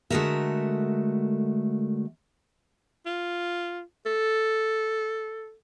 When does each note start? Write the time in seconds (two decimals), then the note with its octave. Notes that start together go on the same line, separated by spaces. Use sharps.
0.10 D3 G#3 A3 F#4 A#4 E5
3.06 F4
4.06 A4